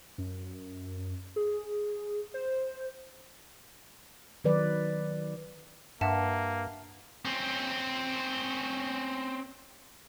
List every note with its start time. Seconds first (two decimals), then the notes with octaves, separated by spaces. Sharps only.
0.18 F#2
1.36 G#4
2.34 C5
4.44 D#3 F#3 B4 D5
6.01 G2 A#3 E5 F#5 A5
7.25 C4 C#4